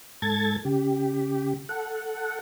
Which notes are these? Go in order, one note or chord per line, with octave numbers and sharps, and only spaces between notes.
G#2 A4 G#6 A6
C#3 G4
A4 F#5